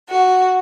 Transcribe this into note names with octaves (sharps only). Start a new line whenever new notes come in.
F#4